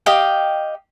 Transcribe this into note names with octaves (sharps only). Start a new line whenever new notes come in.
G4 D#5 F5 G5